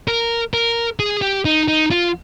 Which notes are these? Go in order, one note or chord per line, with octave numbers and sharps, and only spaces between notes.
A#4
A#4
G#4
G4
D#4
D#4
F4